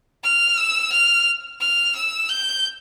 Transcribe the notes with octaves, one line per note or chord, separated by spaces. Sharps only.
F6
E6
F6
F6
E6
G6